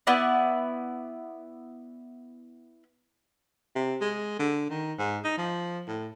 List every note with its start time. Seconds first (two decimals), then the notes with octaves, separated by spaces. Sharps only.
0.07 B3 E4 D5
3.75 C3
4.01 G#3
4.39 D3
4.70 D#3
4.98 G#2
5.24 D#4
5.38 F3
5.88 A2